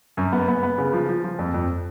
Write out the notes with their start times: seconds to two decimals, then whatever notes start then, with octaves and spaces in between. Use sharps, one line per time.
0.17 F#2
0.32 B3
0.48 B3
0.63 B3
0.78 C#3
0.93 F3
1.09 F3
1.24 F3
1.39 F2
1.54 F2